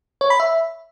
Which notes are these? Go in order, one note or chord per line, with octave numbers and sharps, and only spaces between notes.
C#5
B5
E5